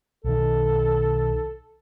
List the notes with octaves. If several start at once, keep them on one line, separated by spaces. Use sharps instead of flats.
B1 D#3 A4